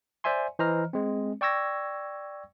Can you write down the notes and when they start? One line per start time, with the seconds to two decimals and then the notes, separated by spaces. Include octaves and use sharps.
0.24 C5 D5 E5 G#5 C6
0.59 E3 C5 D#5 A#5 F6
0.93 G#3 C4
1.41 D5 G5 C#6 E6 G#6 A#6